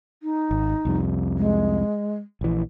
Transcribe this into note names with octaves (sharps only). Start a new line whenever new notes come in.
D#4
G#1
C2 F2 C3
G#3
A#1 E3